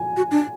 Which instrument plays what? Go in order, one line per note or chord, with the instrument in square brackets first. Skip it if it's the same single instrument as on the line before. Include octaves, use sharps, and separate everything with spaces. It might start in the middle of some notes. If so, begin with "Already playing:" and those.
Already playing: [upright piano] G#5
[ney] F#4
D4